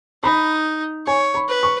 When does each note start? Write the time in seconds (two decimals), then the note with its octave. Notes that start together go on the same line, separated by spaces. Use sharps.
0.23 D#4 B5
1.06 C#5 G#5
1.34 B5
1.48 B4
1.63 C#6